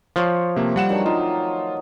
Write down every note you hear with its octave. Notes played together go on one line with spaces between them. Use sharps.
F3 C5 C#5
C3 A3 A#3
G3 F#5 E7
D#3 F#3 D4
D#4 F4